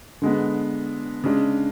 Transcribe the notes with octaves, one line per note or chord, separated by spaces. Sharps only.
D3 G#3 B3
C#3 G#3 D4